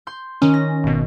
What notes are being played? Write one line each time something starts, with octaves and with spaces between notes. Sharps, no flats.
C6 G6
D#3 C#4
A#6
G#1 B2